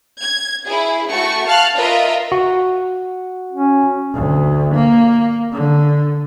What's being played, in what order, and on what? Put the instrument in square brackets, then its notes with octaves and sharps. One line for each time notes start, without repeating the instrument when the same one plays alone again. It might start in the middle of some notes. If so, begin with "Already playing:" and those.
[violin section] G#6
E4 G#4
A3 F#4 C#6
F5 A5 F6 F#6
F4 A#4 B4 D#5 E5
[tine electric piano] F#4
[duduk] C#4
[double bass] D2
A#3
D3